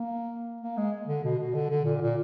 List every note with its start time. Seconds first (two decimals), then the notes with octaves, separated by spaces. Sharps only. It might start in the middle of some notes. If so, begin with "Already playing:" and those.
Already playing: A#3
0.61 A#3
0.77 G#3
1.07 D3
1.24 B2
1.39 B2
1.54 D3
1.70 D3
1.85 A#2
2.01 A#2